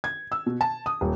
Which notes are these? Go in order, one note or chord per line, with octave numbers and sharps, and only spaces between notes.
G#6
E6
B2
A5
D#6
D#1